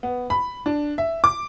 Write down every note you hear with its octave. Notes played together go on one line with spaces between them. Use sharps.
B3
B5
D4
E5
D6